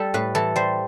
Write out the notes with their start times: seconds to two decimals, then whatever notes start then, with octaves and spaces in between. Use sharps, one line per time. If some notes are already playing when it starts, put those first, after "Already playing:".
Already playing: G3 A4
0.14 A2 B4
0.35 E3 A4
0.56 G3 C5